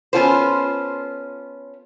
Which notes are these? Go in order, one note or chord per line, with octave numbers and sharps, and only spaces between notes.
B3 C#4 E4 F4 A4 C5